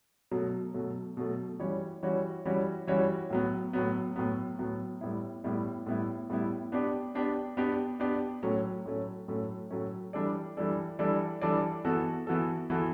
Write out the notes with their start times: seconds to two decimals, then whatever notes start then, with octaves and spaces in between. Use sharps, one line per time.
0.31 B2 F#3 A3
0.74 B2 F#3 A3
1.17 B2 F#3 A3
1.60 E3 G3 C#4 F#4 C#5
2.03 E3 G3 C#4 F#4 C#5
2.45 E3 G3 C#4 F#4 C#5
2.87 E3 G3 C#4 F#4 C#5
3.30 A2 F#3 B3
3.73 A2 F#3 B3
4.16 A2 F#3 B3
4.59 A2 F#3 B3
5.01 A2 G3 B3 E4
5.44 A2 G3 B3 E4
5.86 A2 G3 B3 E4
6.29 A2 G3 B3 E4
6.72 B3 D4 G4 D5
7.15 B3 D4 G4 D5
7.57 B3 D4 G4 D5
8.00 B3 D4 G4 D5
8.43 A2 F#3 A3 C#4
8.85 A2 F#3 A3 C#4
9.28 A2 F#3 A3 C#4
9.71 A2 F#3 A3 C#4
10.13 E3 G3 D4 A4 D5
10.57 E3 G3 D4 A4 D5
10.99 E3 G3 D4 A4 D5
11.41 E3 G3 D4 A4 D5
11.85 E3 B3 F#4 A4
12.27 E3 B3 F#4 A4
12.70 E3 B3 F#4 A4